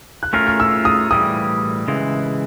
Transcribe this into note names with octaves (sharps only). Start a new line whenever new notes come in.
F#6
A3 C#4 F4 A#4 F6
F6
E6
D#6
A2 E3 G3 D#6
C#3 E3 G#3